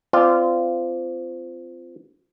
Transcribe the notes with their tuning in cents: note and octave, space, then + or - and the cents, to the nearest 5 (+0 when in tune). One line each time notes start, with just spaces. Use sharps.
C4 -20 F4 -15 D5 +0